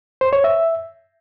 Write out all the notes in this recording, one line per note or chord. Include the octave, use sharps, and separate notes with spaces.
C5
C#5
E5